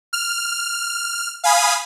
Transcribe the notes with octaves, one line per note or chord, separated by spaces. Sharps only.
F6
F5 G#5 B5 D#6